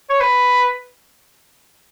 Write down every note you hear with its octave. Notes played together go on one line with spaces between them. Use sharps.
C#5
B4